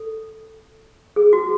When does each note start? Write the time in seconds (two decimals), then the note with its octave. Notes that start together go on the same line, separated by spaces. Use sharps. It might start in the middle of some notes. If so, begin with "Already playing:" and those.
Already playing: A4
1.16 G#4
1.33 F#4